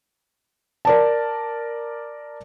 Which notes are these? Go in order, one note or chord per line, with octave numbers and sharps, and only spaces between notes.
A#4 D5 A5